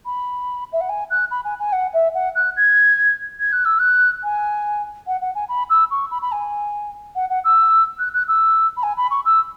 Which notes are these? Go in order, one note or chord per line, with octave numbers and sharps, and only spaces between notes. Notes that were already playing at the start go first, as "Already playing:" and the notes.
B5
E5
F#5
G#5
F#6
B5
G#5
G#5
F#5
E5
F#5
F#6
G#6
G#6
F#6
E6
F#6
G#5
F#5
F#5
G#5
B5
E6
C#6
B5
B5
G#5
F#5
F#5
E6
F#6
F#6
E6
B5
G#5
B5
C#6
E6